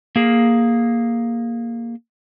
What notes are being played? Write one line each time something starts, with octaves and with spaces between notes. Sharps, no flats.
A#3 G#4